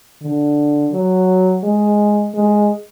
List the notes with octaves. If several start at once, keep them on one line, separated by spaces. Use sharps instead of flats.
D3
F#3
G#3
G#3